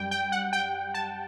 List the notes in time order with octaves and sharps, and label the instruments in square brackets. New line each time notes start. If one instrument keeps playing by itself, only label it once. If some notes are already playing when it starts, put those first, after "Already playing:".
Already playing: [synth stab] F#2 G3 G5
G5
F#5
G5
A5